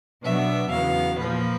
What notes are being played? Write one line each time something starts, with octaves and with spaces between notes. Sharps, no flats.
B2 F#3 B3 D4 E5
E2 C#3 F#3 B3 F5
A#2 F3 A#3 B4